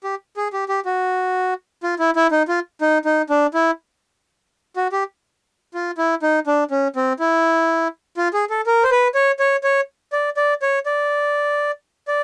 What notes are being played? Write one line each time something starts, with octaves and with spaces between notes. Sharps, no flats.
G4
G#4
G4
G4
F#4
F4
E4
E4
D#4
F4
D#4
D#4
D4
E4
F#4
G4
F4
E4
D#4
D4
C#4
C4
E4
F4
G#4
A4
A#4
C5
B4
C#5
C#5
C#5
D5
D5
C#5
D5
D5